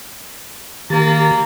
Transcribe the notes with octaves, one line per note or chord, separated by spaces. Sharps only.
D#3 A#3 G4 A6